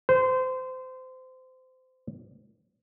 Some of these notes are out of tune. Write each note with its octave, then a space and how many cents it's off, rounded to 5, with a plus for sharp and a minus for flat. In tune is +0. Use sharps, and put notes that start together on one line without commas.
C5 -25